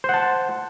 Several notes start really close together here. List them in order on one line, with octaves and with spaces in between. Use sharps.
C5 F#5 A5